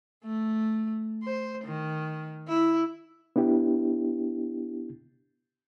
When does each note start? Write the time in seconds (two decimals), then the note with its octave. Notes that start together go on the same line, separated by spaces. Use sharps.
0.25 A3
1.23 C5
1.65 D#3
2.49 E4
3.36 B3 D4 E4 G4